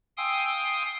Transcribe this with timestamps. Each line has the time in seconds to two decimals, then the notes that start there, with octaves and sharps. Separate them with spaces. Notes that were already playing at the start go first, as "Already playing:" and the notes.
0.17 F5 G5 G#5 C6 D#6 E6